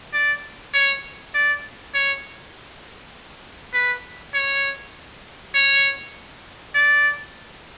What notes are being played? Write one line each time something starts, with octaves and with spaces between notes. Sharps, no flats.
D5
C#5
D5
C#5
B4
C#5
C#5
D5